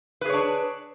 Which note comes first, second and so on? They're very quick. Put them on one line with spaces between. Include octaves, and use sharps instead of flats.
B4 G#4 C#5 D4